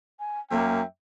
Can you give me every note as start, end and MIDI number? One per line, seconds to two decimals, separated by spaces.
0.19 0.40 80
0.51 0.82 42
0.51 0.81 58
0.51 0.85 76
0.51 0.85 79